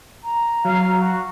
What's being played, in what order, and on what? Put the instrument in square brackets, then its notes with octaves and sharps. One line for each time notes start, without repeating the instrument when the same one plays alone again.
[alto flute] A#5
[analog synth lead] F#3 [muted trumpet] F5
[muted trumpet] F#4